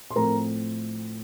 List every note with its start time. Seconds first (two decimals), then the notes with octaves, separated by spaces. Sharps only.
0.11 C6
0.15 A2 F3 A3 C4 A#4 A#5